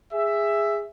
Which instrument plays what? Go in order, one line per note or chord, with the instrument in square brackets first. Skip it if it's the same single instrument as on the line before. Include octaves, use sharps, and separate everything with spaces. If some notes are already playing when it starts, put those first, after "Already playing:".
[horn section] G#4 E5